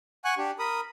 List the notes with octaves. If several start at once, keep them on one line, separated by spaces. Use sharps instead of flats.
F#5 G#5 C#6 F#6
D4 G4
A#4 B5 D#6